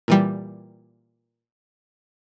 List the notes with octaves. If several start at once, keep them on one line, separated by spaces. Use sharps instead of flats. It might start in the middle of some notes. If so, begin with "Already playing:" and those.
A#2 E3 G3